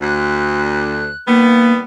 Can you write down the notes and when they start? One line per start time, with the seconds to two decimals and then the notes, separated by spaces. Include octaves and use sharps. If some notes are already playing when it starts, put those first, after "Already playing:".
0.01 D2 F#6
1.28 D#3 G3 A#3 B3